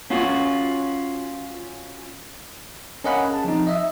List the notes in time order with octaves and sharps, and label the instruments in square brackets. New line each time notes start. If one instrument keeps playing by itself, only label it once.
[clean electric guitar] C#4 F4 F#4
[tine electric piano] C#4 A#4 D#5 F5 F#5 B5
G#4 A5
F3 C4 D#4
D#5 E5